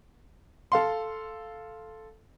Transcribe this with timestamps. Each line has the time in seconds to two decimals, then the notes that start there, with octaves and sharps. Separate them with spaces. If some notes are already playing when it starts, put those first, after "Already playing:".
0.72 A4 F5 C6